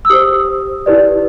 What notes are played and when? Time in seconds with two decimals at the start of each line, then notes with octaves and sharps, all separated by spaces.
0.05 E6
0.10 G4 C5 D#6
0.86 E4 G4 B4 D5